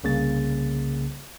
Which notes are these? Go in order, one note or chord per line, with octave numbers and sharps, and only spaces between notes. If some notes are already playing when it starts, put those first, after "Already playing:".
C2 C#3 A#3 A6